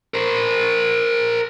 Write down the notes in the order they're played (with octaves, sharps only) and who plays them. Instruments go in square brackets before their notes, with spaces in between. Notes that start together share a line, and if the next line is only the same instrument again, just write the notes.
[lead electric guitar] A#4 C5